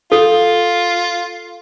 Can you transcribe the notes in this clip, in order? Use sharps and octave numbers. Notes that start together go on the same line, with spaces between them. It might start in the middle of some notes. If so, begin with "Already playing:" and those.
F4 A4